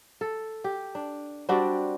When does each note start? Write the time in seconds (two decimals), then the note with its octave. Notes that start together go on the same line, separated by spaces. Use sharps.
0.21 A4
0.64 G4
0.95 D4
1.49 G3 C4 D4 F#4